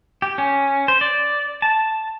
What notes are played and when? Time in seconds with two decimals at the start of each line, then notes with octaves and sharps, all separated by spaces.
0.22 G4
0.38 C#4
0.88 C5
1.01 D5
1.62 A5